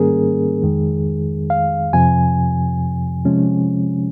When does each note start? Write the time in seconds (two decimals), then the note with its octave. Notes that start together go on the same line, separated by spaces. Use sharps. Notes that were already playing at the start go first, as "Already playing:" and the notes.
Already playing: G#2 D#3 G3 A#3 C#4 G#4 A#4
0.63 F2 D#3 G#3
1.50 F5
1.93 F2 C3 F3 G#5
3.25 C3 F3 G#3 C#4